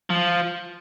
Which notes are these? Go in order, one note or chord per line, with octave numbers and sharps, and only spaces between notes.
F3